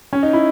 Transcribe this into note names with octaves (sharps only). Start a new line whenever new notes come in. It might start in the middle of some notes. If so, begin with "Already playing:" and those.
C#4
D#4
E4